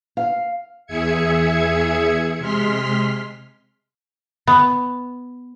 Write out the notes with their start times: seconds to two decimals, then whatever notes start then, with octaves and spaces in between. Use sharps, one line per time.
0.17 F5
0.86 E2 G#4 E5 G#6 C#7
2.39 C3 G#3 C6 F6 B6
4.47 B3